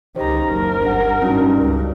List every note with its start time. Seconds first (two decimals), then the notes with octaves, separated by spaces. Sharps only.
0.16 C#2 D#3 G4 C5 A#5
0.48 F#1 A#4
0.82 G1 D4 F#5
1.22 G2 G3 C#4 D#4 F#4
1.60 C#2 G2